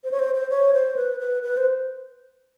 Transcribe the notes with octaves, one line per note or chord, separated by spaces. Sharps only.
C5
C#5
C5
C5
C#5
C5
B4
B4
B4
C5